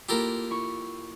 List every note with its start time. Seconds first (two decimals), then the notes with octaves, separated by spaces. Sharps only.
0.09 A#3 E4 F4 G4 A4 A#4
0.51 E4 C#6